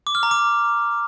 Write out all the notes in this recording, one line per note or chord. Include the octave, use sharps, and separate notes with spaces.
D6
F6
A#5
D6